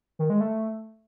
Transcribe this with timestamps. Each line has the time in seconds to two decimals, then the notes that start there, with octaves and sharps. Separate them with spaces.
0.19 D#3
0.30 G#3
0.40 A3